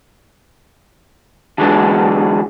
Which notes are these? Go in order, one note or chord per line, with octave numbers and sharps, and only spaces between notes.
D3 E3 F#3 G#3 B3 D4